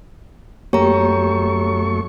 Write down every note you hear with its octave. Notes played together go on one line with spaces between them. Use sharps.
F#2 A3 A#3 G4 C#5 A#5 C#6